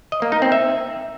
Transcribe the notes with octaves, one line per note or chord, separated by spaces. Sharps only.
D#5
A#3
D#4
C4
E5